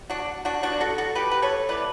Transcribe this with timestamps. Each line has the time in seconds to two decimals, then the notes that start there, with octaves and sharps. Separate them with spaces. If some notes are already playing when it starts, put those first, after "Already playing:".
Already playing: G3
0.10 D4 F#4
0.45 D4 F#4
0.63 B2 G3 B3 D4 F#4
0.80 F#4 A4
0.98 F#4 A4
1.15 G4 B4
1.31 B4
1.42 A4 C#5
1.69 E3 G3 B3 B4 D5